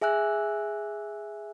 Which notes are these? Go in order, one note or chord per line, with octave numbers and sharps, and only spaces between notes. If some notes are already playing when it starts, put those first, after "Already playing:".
G#4 E5 G#5 E6 F#6